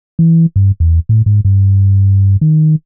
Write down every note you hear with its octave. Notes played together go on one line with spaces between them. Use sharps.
E3
G2
E2
A2
G#2
G2
D#3